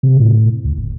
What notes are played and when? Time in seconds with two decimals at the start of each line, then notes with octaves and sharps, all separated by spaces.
0.03 C3
0.19 A2
0.64 D2
0.77 F1